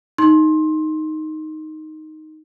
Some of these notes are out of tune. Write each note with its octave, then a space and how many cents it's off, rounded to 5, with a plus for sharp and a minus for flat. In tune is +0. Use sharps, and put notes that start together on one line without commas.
D#4 +0 C6 +20